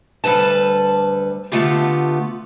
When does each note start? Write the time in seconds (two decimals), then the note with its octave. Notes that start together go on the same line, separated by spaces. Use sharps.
0.24 D2 G3 A4 B4 A5
1.52 D3 A3 B3 F4 G4